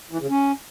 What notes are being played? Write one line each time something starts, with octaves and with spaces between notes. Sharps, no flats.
E3
C#3
C#4